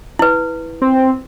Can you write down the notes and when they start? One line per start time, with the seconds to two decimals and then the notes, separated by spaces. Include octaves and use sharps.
0.19 E4 B4
0.82 C4